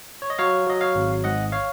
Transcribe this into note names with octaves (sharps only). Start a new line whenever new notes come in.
C#5
D#5
F#3 C#5 F5
F#3 D#5
C#5 F5
G#1
G#2 D#5 F#5
C#5 F5